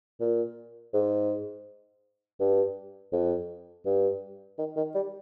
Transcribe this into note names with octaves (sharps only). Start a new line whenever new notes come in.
A#2
G#2
G2
F2
G2
D#3
D#3
G3